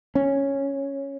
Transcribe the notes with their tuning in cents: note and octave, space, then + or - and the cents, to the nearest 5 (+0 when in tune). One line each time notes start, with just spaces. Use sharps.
C#4 -5